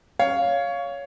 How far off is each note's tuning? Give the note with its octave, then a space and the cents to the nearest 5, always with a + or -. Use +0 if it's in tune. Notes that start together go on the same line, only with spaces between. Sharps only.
C#5 +15 F5 +0